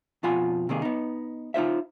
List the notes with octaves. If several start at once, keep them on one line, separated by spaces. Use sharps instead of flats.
F2 B2 F4 F#5 G#5 B5
C3 D#3 A#3 G#4
B3 D#4
D#4 F4 C5 E5